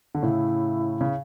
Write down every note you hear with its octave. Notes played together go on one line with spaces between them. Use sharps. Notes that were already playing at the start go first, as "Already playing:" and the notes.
D3
A2 C#3 E4
C#3